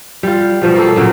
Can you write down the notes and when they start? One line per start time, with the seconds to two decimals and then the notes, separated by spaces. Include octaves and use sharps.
0.23 G3 F4
0.62 B2 F3 G3
0.75 A#3 A4
0.96 A#2 C#3 F#3